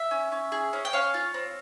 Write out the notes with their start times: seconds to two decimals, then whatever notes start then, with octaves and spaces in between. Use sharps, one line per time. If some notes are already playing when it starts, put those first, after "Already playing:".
Already playing: E5
0.11 C#4
0.32 C#4
0.52 G#4
0.73 C#4
0.85 G5
0.93 C#4 C#5 F5
1.14 F4
1.34 C4